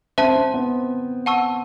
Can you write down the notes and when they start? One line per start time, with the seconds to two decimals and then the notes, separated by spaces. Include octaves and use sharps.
0.18 C4 C5 E5 A5
0.35 C4
0.54 B3
1.26 F#5 A5 C#6 E6